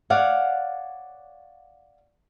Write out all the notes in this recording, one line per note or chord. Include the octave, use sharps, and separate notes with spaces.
C#5 D5 F5 F#5